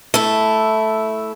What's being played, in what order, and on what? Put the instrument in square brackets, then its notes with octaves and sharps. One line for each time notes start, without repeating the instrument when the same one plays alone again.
[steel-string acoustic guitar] A3 E4